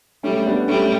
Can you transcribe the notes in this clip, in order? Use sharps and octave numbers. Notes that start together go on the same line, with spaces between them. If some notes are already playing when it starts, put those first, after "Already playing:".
G3 A3 C#4
B3 D4
G3 A3 C#4